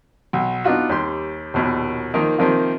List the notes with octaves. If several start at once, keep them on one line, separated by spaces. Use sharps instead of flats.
B1
B3 D4 D#4 F4 F#4
D#2 G3 G4 C6
A#1 D#2 B2
D#3 F3 A#3 D#4
C3 D#3 F3 A#3 F4